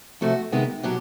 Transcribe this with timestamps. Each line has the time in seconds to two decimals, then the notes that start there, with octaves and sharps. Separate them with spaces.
0.21 F2 C3 F3 A3 F#4
0.52 C3 D#3 G#3 B3
0.83 B2 F#3 G4